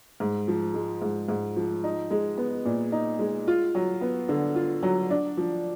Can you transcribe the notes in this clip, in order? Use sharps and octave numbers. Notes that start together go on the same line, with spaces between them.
G#2
F3
G#3
G#2
G#2
F3
D#4
G#3
B3
A#2
D#4
G#3
F4
F#3
B3
D3
F4
F#3
D4
F3